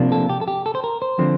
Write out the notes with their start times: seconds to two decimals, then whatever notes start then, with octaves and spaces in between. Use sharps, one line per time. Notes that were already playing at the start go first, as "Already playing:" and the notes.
Already playing: C3 F3 A#3 D4
0.12 A4
0.29 G4
0.41 A4
0.48 G4
0.66 A4
0.75 C5
0.84 A#4
1.02 C5
1.19 D3 F3 C4